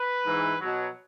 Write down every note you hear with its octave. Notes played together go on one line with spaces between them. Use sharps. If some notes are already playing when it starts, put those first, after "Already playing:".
Already playing: B4
G#2 E3
B2 F#3